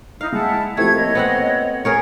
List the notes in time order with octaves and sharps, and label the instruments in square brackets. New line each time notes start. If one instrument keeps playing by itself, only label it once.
[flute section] D#4 E4 [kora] F5
[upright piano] G#3 [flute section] E4 F#5 A5
[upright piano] F3 C4 G4 [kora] A3 [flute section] E4 G#6
[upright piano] A#3 A4 [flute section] C#5 D#5
[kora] B3 C4 F#5
G#4 A#4 C#5